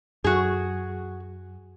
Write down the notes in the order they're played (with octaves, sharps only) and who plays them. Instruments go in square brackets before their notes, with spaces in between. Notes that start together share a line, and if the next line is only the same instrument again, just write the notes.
[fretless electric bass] F#2 [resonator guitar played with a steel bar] F#4 G#4